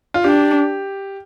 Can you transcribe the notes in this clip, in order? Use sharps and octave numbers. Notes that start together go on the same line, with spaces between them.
F4
D4 G4